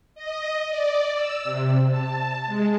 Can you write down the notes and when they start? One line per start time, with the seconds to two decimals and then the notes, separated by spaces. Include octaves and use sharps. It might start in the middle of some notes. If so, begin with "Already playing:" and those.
0.15 D#5
0.69 D5
1.15 E6
1.44 C3
1.89 A5
2.46 G#3